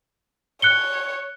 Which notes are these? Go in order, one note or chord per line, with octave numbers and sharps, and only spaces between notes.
C#5 F#6 C#7 G7